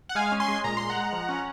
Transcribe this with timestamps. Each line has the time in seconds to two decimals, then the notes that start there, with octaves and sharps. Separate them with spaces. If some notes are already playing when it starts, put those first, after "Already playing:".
0.09 F#5
0.15 G#3 F5 G#5
0.32 C#4
0.40 G#5 C6
0.48 G#3
0.64 A#2 A#5
0.77 G#3 C6
0.90 F#5 A#5
0.96 G#3
1.13 F3
1.29 C#4